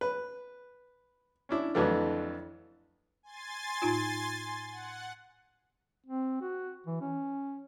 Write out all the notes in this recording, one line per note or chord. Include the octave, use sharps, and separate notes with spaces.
B4
C#4 D4 E4
F2 D3 E3 F#3 A3 D4
G#5 C6 A6
A2 D#4 F4
F#5
C4
F#4
E3
C#4